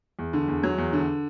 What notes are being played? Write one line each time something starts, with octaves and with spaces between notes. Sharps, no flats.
E2
D3
E2
F#3
E2
D3